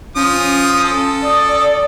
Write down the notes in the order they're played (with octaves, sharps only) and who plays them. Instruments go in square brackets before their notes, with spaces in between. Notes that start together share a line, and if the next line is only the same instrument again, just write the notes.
[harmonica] F3 D#6 [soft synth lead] C#4
[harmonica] A4
[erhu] D5 [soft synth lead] D#6